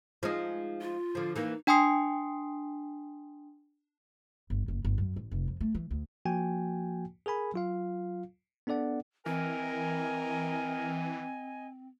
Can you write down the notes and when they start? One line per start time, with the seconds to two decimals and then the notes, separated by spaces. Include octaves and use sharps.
0.23 F3 G#3 D#4
0.81 F4
1.15 D3 F3
1.36 E3 A#3 D#4
1.67 D4 G5 G#5 C6 D#6 C7
4.50 G1
4.68 F#1
4.85 G1
4.98 F#2
5.16 A1
5.31 F1
5.47 F2
5.61 A3
5.74 E3
5.91 D2
6.25 F3 A#3 F#4 G5 G#5
7.26 G#4 A#4 G#5 B5
7.54 F#3 F4 F5
8.67 B3 D4 A4 D5 F#5
9.26 E3 C4 A#4 D#5 G#5